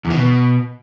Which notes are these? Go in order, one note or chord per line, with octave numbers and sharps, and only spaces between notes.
E2
D#3
B2